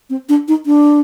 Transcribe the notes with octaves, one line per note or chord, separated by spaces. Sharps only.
C4
D4
D#4
D4